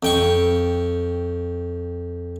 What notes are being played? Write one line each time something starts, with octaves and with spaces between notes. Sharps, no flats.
F2 G5 C#6